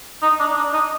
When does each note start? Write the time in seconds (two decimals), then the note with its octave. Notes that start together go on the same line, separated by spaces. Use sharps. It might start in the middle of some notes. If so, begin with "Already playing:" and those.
0.22 D#4
0.40 D4
0.56 D4
0.73 D#4